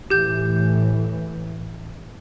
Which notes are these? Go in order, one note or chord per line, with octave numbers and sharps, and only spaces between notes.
A2 E3 G4 G6